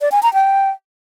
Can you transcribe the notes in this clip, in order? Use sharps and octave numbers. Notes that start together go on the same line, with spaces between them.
D5
G#5
A#5
G5